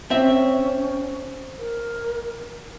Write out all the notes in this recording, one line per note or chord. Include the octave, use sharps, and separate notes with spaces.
C4 C#4 E5
A#4